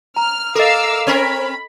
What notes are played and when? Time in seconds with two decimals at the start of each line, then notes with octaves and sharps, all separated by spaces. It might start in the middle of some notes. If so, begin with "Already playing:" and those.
0.16 A#5 F6
0.55 A4 A#4 D#5 F5 D6 E6
1.07 C4 C#4 A#4 B5